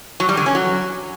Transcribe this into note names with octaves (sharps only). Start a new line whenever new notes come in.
F#3
G3
D3
C#4
F#3